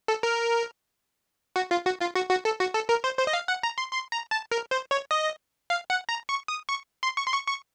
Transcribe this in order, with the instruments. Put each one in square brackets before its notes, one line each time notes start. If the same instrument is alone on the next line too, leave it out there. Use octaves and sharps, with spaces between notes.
[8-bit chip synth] A4
A#4
F#4
F4
F#4
F4
F#4
F#4
A4
F#4
A4
A#4
C5
C5
D#5
F5
F#5
A#5
C6
C6
A#5
A5
A#4
C5
C#5
D#5
F5
F#5
A#5
C#6
D#6
C#6
C6
C#6
C6
C#6
C#6